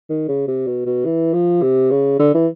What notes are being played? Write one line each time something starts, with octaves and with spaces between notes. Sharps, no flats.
D#3
C#3
C3
B2
B2
E3
F3
C3
C#3
D3
E3